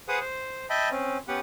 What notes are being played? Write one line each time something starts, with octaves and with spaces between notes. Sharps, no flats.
G#4 B4 C5 F#5 D#6
C5
D#5 E5 G5 A5 B5
C4 C#4
B3 C#4 G4 B4 F#5